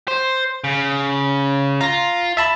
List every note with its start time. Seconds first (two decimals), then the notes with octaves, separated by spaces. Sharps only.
0.08 C5
0.64 C#3
1.81 F4 A#5 A#6
2.37 E5 A5 B5